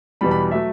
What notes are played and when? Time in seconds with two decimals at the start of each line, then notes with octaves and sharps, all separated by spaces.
0.21 E2 B2 G3 B5
0.31 B5
0.51 F#3 A3 E5